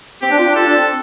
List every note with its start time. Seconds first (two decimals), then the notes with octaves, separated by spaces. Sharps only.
0.22 C4 G4
0.31 D4
0.39 F4
0.47 D4
0.55 F4 A4
0.66 D4
0.77 C4